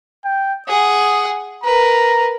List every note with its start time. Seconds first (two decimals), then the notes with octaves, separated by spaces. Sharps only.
0.25 G5
0.68 G#4 F#5 D#6
1.64 A#4 B4 A#5